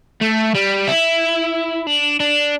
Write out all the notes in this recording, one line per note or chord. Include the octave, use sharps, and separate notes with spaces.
A3
G3
E4
D4
D4